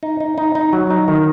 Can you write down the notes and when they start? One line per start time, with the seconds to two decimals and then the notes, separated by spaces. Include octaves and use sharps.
0.03 D#4
0.20 D#4
0.38 D#4
0.55 D#4
0.73 F#3
0.90 D#4
1.08 D#3